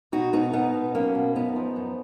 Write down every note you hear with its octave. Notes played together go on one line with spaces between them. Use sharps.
B2 D#4 F#4
B2 B3 D#4
B2 B3 D#4
B2
F#3 A#3 C#4
B2
F#2 B3 D#4
F3
F#2